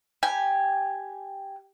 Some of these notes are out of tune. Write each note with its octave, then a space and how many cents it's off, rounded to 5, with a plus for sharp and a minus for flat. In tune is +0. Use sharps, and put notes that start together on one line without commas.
G4 +0 G#5 +0